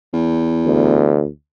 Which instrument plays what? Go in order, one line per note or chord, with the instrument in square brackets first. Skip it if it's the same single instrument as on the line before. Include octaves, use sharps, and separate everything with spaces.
[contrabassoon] E2
[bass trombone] D2